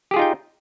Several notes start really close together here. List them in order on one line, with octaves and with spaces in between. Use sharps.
G4 G#4 F4 D#4 G5